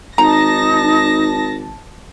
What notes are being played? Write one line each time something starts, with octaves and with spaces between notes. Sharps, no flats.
G#1 D#4 A5 A#5 A#6